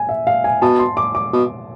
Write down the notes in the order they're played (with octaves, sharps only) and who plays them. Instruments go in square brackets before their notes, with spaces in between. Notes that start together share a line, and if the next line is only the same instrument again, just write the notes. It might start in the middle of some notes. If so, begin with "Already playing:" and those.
Already playing: [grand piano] G#5
E5
F5
G#5
[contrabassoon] B2 [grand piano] A5
[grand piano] C6
D6
D6
[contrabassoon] B2